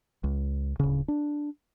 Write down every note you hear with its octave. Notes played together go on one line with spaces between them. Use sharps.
C#2
D1 C#3
D4